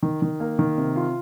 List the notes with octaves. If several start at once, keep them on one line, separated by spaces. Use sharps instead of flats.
D#3
D#3
A#3
D#3
C3
F4